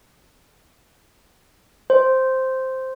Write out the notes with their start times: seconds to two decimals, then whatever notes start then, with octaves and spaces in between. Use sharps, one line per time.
1.90 C5